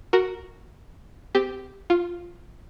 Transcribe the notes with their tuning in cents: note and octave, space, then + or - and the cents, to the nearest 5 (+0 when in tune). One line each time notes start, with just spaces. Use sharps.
F#4 +0 A#4 +0
C4 -30 G4 +0
F4 +0 F5 +0 C6 +30